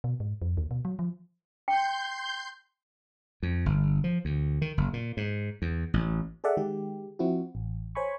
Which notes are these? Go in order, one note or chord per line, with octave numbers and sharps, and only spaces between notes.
B2
G#2
F2
D#2
B2
F#3
F3
G5 C6 G6
F2
G1
F3
D2
D#3
F#1
A#2
G#2
E2
A1
G#4 A4 D5 E5 F#5
D#3 G#3 G4
F3 C4 E4 F#4
A1
C5 C#5 G#5 B5 C#6